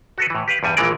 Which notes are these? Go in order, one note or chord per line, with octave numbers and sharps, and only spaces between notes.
F#4 A4 B4
A2 E3
G4 B4 F5
E2 G2 G3 G#5
A#1 A#2 E3 G#3 A#4 D5